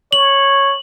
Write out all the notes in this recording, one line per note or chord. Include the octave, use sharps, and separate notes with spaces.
C#5 F#7